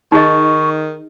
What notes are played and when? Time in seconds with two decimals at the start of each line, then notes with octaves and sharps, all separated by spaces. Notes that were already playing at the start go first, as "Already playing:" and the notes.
0.12 D#3 D#4 G#4 D#5 C#6